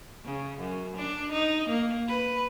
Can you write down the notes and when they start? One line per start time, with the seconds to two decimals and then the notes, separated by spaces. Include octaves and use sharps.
0.24 C#3
0.59 F#2
0.96 D4
1.32 D#4
1.69 A#3
2.08 B4